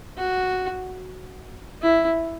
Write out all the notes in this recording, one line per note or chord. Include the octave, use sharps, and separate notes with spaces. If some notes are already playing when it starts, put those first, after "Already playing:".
F#4
E4